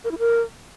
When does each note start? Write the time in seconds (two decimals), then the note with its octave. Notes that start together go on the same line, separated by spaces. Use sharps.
0.04 A#4
0.11 E4
0.18 A#4